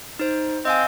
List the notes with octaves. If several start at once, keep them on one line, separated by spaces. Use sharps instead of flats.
D#4 C5
C4 D#5 F5 G#5